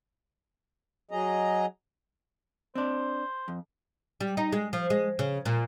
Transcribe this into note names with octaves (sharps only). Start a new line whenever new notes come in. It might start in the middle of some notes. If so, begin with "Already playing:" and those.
F#3 G#4 D#5 A#5
C4 D4 C5
F2
G3
D#4
G#3
F3
G#3
C#3
A#2